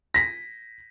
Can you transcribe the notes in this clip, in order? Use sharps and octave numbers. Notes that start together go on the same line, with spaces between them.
A#6 B6